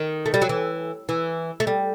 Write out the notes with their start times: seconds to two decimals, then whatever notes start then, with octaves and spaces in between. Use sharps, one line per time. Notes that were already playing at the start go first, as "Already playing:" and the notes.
Already playing: D#3
0.26 A3
0.34 G3
0.42 F#3
0.49 E3
1.09 E3
1.60 A3
1.67 G3